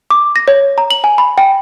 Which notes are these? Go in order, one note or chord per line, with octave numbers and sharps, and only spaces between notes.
D6
A#6
C#5
A#5
F#7
G#5
B5
G5